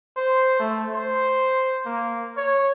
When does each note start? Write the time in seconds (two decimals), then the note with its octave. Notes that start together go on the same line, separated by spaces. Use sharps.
0.17 C5
0.60 A3
0.94 C5
1.86 A#3
2.37 C#5